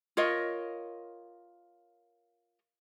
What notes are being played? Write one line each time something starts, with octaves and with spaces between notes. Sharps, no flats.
F4 A#4 C#5 D#5